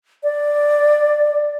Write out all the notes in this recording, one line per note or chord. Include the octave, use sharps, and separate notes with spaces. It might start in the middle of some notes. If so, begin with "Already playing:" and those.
D5